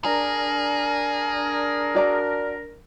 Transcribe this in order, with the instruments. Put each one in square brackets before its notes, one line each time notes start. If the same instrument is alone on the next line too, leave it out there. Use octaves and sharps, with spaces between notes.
[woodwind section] D4 A#4 [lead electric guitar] G#4 [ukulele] A#5
[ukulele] F#4 D5 A#5